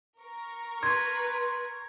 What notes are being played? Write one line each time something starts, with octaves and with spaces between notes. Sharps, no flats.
A#4 C#6
B4 C6 G#6